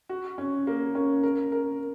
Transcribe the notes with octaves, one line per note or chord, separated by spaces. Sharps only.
F#4
C#4
A#3
C#4
A#4
A#4